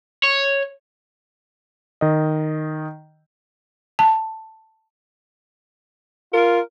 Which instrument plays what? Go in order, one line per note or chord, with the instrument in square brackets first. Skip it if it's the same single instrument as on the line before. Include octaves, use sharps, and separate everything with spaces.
[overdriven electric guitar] C#5
[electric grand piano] D#3 D#5
[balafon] A5
[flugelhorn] F4 [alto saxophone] A#4